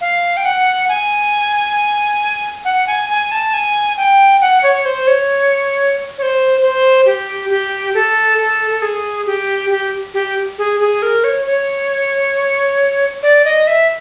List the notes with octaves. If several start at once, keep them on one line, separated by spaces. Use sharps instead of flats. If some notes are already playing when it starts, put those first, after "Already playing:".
F5
G5
F#5
G#5
F#5
G#5
G#5
A5
G#5
G5
F#5
C#5
C5
C#5
C#5
C5
C5
G4
G4
A4
A4
A4
G#4
G4
G4
G4
G#4
G#4
A#4
C#5
C#5
D5
D#5
E5